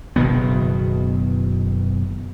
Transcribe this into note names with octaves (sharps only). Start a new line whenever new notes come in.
F#1 B2 D#3 B3